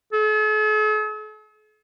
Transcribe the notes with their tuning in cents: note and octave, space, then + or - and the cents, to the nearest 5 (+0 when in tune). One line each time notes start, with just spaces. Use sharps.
A4 -45